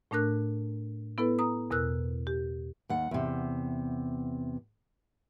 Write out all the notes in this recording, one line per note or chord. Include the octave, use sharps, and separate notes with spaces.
A2 A3 D4 A#4 F#6
B3 E4 A4 B4
A#5 D#6
E2 B2 A#4 E6 F#6
G4
D#2 F#5
E2 C3